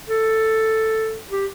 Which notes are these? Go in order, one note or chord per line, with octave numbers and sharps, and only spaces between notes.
A4
G4